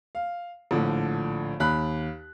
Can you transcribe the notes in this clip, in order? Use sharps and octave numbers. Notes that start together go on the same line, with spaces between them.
F5
A#1 A2 D3 F3
D#2 B5 F#6